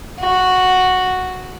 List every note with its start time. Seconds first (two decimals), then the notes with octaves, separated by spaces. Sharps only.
0.20 F#4